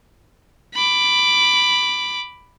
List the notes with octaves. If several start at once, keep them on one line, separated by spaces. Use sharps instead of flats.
B5 D6